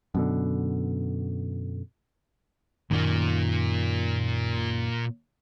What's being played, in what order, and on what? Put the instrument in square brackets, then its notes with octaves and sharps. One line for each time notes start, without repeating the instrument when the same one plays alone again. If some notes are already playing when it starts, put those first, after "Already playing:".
[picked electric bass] F#2 B2 D3
[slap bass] F#2 D#3 [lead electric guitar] A#2 A#3